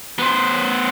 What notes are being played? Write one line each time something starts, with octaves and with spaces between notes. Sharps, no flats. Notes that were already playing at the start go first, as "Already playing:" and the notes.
B3 C5